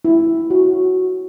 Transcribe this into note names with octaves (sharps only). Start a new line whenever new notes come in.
E4
F#4